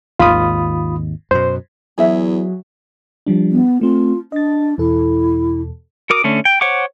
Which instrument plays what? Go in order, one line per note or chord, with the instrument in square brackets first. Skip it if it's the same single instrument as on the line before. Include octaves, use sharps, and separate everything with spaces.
[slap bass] G#1 D#2 [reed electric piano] F4 B5 D#6
[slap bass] F#2 B2 [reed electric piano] C5
[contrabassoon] E2 [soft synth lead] F#3 [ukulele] G#4 E5
[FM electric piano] F3 G3 D4
[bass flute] B3
[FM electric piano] A3 C4 [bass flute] F4
[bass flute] D4 [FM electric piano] D#5 A6
[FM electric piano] E2 B2 A4 [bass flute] E4
[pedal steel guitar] F#4 A#4 D6 D#6
D3 A3 C#4
G5
C5 C#5 F#5 C#6 D6